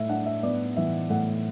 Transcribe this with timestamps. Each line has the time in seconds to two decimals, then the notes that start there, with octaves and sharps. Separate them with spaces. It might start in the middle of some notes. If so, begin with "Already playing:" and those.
Already playing: A2 E5
0.09 D4 F#5
0.26 E5
0.43 B3 D5
0.77 E3 E5
1.10 A2 F#5